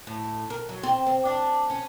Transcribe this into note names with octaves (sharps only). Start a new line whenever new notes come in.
A2
A#4
F#3
C4
C4
D4
C#4